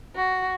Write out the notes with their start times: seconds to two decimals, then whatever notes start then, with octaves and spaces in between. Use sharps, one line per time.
0.15 F#4